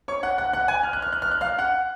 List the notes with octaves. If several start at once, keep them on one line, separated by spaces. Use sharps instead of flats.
C#5 C#6
F#5 F#6
F#5 F#6
F#5 F#6
G#5 G#6
F6
F#6
F6
F#6
F6
F#6
F5 F6
F#5 F#6